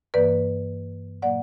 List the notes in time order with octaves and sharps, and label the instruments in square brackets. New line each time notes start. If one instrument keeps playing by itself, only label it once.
[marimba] G2 E3 A#3 B4 D5
A#2 F#3 A#3 D5 F#5